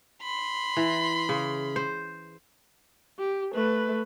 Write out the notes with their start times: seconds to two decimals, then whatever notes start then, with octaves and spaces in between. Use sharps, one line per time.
0.23 B5 C6
0.77 E3
1.29 C#3
1.76 C5
3.19 G4
3.55 A3 B4